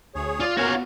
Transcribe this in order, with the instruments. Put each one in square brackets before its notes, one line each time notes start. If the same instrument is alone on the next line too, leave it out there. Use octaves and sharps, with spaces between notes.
[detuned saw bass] D2 [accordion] G#4 C#5
[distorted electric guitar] F4 [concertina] D5
[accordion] A#3 C#4 A#4 [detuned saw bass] B3 [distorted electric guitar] F#4 F5 [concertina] C#5